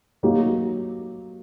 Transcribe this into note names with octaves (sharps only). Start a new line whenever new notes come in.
F#3 A#3 D#4 G4